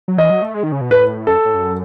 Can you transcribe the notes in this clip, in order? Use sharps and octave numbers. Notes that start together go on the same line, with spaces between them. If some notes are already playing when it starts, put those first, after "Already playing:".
F#3
E3 D#5
F#3
A3
G#3
D#3
C#3
B2
A2 B4
F#2 A4
A2
F#2